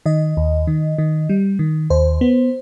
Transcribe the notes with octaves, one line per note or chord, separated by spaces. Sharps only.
D#3 D#5
D#2
D#3
D#3
G3
D#3
D#2 C5
B3